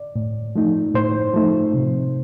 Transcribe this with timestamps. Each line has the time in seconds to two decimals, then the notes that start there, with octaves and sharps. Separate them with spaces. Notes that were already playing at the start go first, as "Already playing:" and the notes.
Already playing: D5
0.16 A2
0.56 F3 A3 D#4
0.94 A2 C5
1.34 F3 A3 D#4
1.74 C3